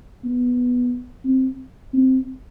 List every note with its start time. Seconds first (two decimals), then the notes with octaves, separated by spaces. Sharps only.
0.24 B3
1.25 C4
1.94 C4